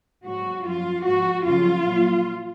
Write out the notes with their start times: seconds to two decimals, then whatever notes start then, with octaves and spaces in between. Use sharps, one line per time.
0.26 G#2 F#3 F#4
0.66 F#2 F3 F4
1.05 G#2 F3 F#4
1.45 F2 C#3 F#3 F4
1.85 A#2 F#3